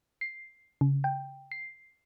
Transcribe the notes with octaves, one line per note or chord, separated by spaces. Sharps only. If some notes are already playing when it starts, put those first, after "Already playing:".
C7
C#3
G5
C7